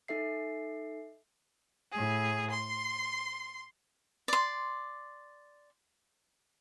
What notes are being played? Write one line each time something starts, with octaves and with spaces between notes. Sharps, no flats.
D#4 A4 E5 C7
A2 G#4
C6
D5 C6